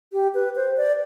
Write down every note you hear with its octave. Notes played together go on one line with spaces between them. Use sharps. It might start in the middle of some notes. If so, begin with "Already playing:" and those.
G4
B4
C5
D5